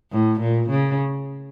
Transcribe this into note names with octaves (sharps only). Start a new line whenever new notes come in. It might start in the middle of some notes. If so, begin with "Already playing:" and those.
A2
A#2
C#3